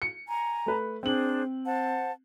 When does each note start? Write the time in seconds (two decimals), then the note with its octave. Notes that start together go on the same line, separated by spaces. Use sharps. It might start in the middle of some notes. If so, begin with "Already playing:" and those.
0.02 C#7
0.28 G#5 A#5
0.66 A3 B4
1.03 C4 D4 G#4 C5 F#7
1.65 C5 F#5 A5